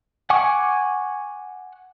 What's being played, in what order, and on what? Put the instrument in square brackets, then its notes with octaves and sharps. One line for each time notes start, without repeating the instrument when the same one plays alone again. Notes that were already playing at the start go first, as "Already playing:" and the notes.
[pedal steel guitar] F#5 G#5 C#6 D6